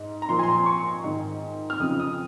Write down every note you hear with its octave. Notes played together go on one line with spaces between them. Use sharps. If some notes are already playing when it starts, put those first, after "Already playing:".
Already playing: G#2
A#5
A#2 F3 C6
G#5
C6
A#5
C6
C#6
G#2 D#3
F6
F2 C#3 F3 D#6
D#6